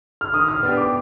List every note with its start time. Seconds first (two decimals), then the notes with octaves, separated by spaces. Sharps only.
0.21 F6
0.34 D#3 D#6
0.48 F6
0.63 B3 D4 G4
0.77 D6